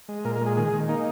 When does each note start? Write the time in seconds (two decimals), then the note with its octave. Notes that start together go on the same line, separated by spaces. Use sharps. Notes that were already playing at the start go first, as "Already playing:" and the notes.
0.09 G#3
0.25 A#2 A#4
0.35 A#4
0.41 G#3
0.46 G#4
0.57 D#3 G#4
0.73 D#3
0.89 A#3 D#4